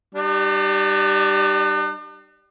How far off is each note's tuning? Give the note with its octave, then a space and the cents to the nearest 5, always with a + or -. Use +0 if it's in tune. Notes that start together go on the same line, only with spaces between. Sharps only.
G3 -10 D4 +45